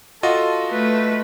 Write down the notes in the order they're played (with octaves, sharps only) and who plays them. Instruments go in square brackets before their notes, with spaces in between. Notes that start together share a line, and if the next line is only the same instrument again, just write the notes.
[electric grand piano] F4 F#4 D#5 [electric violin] A4
[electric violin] A3 B4